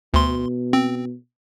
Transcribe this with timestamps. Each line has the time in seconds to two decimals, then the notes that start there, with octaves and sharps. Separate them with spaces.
0.14 D2 B2 C6
0.73 C4